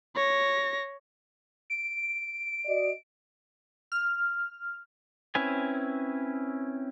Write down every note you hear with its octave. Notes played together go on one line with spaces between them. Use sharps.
C#5 A#6
D7
F#4 D5 D#5
F6
C4 C#4 E4 B4 G#5